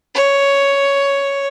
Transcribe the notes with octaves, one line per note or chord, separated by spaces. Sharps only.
C#5